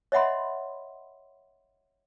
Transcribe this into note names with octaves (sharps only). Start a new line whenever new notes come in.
C#5 D#5 E5 F#5 B5 C6